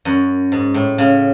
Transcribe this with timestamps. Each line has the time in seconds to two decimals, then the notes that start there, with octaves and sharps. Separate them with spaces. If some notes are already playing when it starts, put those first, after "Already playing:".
0.05 F#2
0.52 G#2
0.74 A2
0.98 C#3